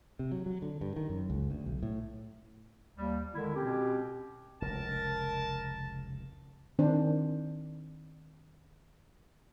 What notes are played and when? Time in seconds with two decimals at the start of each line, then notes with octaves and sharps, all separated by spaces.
0.19 C3
0.31 F#3
0.46 F#3
0.62 D3
0.81 G2
0.96 D#3
1.09 F#2
1.30 C#2
1.51 D2
1.66 B1
1.83 A2
2.97 D#2 G3
3.34 D3 D#3 G#3 E4
3.55 B2 C4 C#4 G4
4.62 F1 C#2 A#4 A5
6.79 D#3 C4 D4 C5